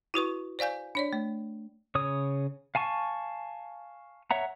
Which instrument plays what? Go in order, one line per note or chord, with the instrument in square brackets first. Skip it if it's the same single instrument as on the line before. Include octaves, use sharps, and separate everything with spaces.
[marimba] E4 F#4 B4 C#6
C5 D5 F5 G#5 G6
D4 C#5 D5
A3
[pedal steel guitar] C#3 C#5 D#6
F5 G#5 A5 C#6
C#5 E5 F#5 A#5